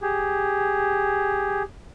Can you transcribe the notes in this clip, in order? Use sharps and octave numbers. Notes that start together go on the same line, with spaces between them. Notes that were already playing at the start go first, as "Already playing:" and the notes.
G4 G#4